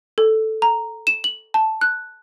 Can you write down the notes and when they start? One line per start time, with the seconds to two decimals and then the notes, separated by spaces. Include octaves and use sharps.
0.18 A4
0.62 A#5
1.07 E7
1.24 F#7
1.54 A5
1.81 F#6